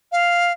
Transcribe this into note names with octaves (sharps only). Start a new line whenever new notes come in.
F5